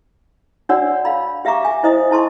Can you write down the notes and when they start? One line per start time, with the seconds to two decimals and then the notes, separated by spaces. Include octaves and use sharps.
0.69 D4 F#4 C#5 D5 F#5 E6
1.05 F5 B5
1.45 G4 E5 F5 A#5 C#6 D6
1.65 G#5
1.83 E4 C5 D#5 D#6
2.11 E4 A5 C6 C#6